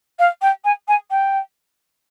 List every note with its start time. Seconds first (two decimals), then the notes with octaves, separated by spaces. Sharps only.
0.19 F5
0.42 G5
0.64 G#5
0.88 G#5
1.10 G5